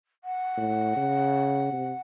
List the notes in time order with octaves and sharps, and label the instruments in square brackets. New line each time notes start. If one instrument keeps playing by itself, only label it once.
[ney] F#5
[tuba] A2
C#3
C3